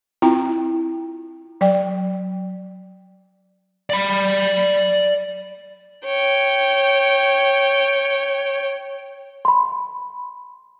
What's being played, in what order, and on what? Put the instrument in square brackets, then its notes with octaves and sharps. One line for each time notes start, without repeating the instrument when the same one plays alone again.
[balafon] C4 E4 F4 G5 A#5
F#3 D5 G5
[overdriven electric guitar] D5 B5
[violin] C#5 G5
[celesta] B5 C6